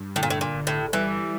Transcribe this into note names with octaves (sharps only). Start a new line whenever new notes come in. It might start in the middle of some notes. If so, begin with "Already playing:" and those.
Already playing: G2
A2 D3
A#2
A2
A#2
G1
A2
E3 G3